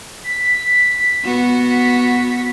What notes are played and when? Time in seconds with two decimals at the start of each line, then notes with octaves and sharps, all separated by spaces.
0.24 B6
1.24 B3 F#4
1.70 B6